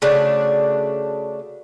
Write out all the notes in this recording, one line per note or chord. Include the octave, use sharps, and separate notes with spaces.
C#3 A3 D4 F#4